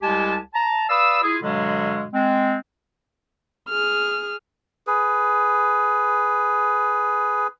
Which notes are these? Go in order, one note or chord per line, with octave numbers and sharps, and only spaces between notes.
C2 G#3 G4 G#5 A5
A5 A#5
B4 D5 F5 D#6 E6
E4 F4 G#4
G2 B2 D3 F#3 G#3
G#3 C4
G#4 F6
G#4 B4